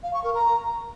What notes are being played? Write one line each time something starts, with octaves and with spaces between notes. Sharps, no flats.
F5
C#6
A#4
A#5